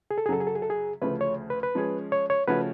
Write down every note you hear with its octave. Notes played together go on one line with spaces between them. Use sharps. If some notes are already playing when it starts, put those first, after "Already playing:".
G#4
A4
G#4
F#2 C#3 F#3 A4
G#4
A4
G#4
A4
G#4
D2 C#3 F3 A3 B4
C#5
B4
B4
F3 G#3 C#4 G#4
C#5
C#5
C#3 F3 A3 C#4 F#4 B4